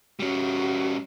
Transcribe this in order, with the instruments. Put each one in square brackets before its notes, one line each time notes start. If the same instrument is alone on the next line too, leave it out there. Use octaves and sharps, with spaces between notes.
[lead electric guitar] G3 C#4 [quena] F#4